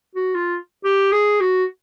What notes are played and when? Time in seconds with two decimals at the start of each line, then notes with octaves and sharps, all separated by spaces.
0.15 F#4
0.35 F4
0.84 G4
1.12 G#4
1.41 F#4